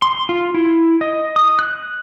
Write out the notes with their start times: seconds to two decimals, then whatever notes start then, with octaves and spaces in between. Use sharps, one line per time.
0.02 C6
0.29 F4
0.54 E4
1.01 D#5
1.36 D#6
1.59 F#6